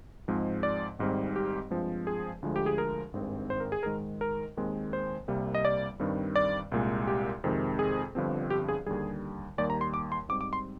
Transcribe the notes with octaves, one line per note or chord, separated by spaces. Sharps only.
G#2 F3 G#3 C4
D5
G#1 G#2 G3 C4
G4
G2 F3 G#3 C4
G#4
D2 D3 F3 G#3
G4
G#4
A#4
G#1 G2 D#3 G#3 C4
C5
A#4
G#4
G#2 D#3 G#3 A#4
A#4
D#2 D#3 G#3 C4
C5
C2 C3 G3 A#3
D#5
D5
G2 D#3 G3 C4
D5
C2 A#2 G#3
G4
F2 C3 D#3 G#3 C4
G#4
G1 G2 D3 F3 C4
G4
G#4
D#2 D3 G3 G#4
D#2 D#3 G3 A#3 D5
A#5
C6
D6
C6
G#2 G3 C4 D6
D6
C6